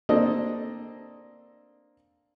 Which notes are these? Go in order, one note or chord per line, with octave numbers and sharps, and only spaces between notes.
A#3 C4 D4 A4 D#5